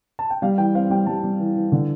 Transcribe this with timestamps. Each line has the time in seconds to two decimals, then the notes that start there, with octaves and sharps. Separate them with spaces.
0.19 A5
0.30 G5
0.42 G3 F5
0.58 E3 G5
0.75 C4 F5
0.90 G3 G5
1.06 G3 A5
1.23 G3
1.39 E3
1.56 E3
1.72 D3